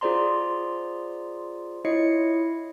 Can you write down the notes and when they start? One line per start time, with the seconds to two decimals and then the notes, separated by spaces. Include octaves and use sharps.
0.01 F4 G#4 C5 D5 A#5 C6
1.85 E4 F4 C#5 D#5 C7 C#7